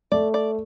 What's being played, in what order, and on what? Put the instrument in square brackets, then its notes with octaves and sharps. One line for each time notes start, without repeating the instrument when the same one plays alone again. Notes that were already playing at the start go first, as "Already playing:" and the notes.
[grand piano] A3 [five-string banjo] D5
[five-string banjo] D5